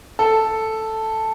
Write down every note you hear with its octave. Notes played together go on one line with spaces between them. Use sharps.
A4